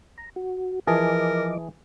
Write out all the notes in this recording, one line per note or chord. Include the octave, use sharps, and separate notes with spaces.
A#5
F#4
E3 F3 G#4 A#4 D#5 A5 D6